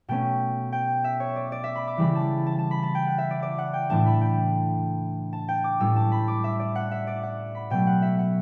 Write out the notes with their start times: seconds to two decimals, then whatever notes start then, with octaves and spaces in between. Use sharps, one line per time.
0.08 B2 A3 C#4 G5
0.72 G5
1.04 E5
1.20 C#5
1.36 D5
1.52 D5
1.64 E5
1.75 B5
1.88 D6
1.97 C#3 E3 G3 B5
2.15 A5
2.46 A5
2.59 A5
2.71 B5
2.83 A5
2.95 G5
3.06 F#5
3.18 E5
3.31 D5
3.43 D5
3.58 F#5
3.73 G5
3.90 A2 E3 A3 D4 A5
4.06 B5
4.21 G5
5.33 A5
5.48 G5
5.64 D6
5.80 A2 G3 C#4 E6
5.96 A5
6.12 B5
6.28 D6
6.44 E5
6.60 D5
6.75 F#5
6.91 E5
7.07 D5
7.23 F#5
7.55 B5
7.70 B2 F#3 A3 G5
7.87 F#5
8.02 E5
8.19 F#5